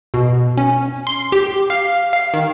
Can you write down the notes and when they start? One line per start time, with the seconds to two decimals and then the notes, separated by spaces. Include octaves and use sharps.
0.14 B2
0.58 C#4
1.07 C6
1.32 G4
1.70 F5
2.13 F5
2.34 D#3